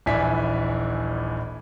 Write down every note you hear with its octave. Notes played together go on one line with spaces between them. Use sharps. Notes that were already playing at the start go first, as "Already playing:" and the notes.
D#1 A#1 E3 D5 G#5 B6